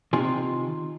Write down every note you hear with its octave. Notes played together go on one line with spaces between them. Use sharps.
C3 D#3 F4 G#5